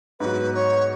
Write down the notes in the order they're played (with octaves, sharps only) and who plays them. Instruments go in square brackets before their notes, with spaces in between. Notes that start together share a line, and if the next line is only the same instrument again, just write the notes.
[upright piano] G#2 F#3 B3 F#4 [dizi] B4
[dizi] C#5